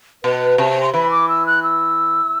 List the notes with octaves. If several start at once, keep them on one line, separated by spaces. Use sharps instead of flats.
B2 B4
C3 A5
C6
E3 B5
D6
E6
F#6
E6